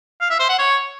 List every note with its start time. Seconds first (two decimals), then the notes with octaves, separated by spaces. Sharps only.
0.21 F5
0.30 E5
0.40 C5
0.49 F#5
0.59 C#5